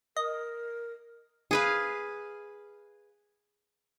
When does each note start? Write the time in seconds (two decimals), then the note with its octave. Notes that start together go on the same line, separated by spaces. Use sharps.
0.17 A#4 D#5
1.51 G#4 B4 F5